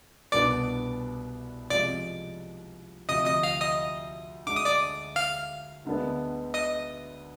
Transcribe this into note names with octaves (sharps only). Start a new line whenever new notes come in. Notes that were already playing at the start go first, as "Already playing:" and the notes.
C2 B2 B3 D4 D5 D6
C3 F3 G#3 D5 D6
D2 C3 F3 D#5 D#6
D#5 D#6
F5 F6
D#5 D#6
D2 D3 G#3 D6
D#6
D5 D6
F5 F6
D2 D3 G#3 B3 D4
D#5 D#6